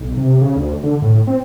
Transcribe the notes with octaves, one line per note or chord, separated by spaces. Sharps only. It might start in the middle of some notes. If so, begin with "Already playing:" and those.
B1
C3
C#3
D2
D3
A2
C4